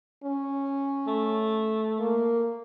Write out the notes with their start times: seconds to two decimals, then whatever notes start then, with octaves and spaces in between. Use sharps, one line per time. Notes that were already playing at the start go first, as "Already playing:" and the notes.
0.24 C#4
1.07 A3
1.99 A#3